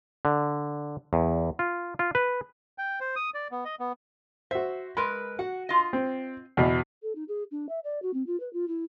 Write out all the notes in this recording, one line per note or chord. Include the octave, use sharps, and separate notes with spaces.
D3
E2
F4
F4
B4
G5
C5
D#6
D5
B3
D#5
B3
F#4 C5 E5
G#3 A#4 B4 B5
F#4 F#5
F4 D#5
C4
E2 B2 D#5
A4
D#4
G#4
D4
E5
D5
F#4
C4
F4
B4
F4
E4